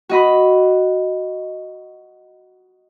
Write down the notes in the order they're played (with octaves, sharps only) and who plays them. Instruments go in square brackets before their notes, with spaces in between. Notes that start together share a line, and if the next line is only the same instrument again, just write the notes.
[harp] F#4 D#5 B5